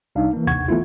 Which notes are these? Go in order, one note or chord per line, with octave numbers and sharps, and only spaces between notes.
C2 D4 D#4 F5
E3 A#3
A1 D#2 C3 F#5 C#6 G#6
E3 A3 B3 E4 F4